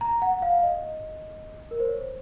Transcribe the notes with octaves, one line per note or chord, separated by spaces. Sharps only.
A#5
F#5
F5
D#5
A#4
C5
C#5